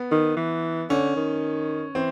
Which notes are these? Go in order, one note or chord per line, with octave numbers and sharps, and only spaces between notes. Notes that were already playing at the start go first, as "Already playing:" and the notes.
Already playing: B3
D#3
E3
D3 C#4
D#3
E3 C4